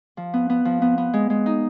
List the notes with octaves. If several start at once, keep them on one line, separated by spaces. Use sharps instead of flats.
F3
B3
B3
F3
B3
B3
G#3
G#3
D#4